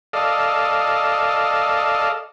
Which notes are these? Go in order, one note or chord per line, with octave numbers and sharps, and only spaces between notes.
A4 D5 D#5 F5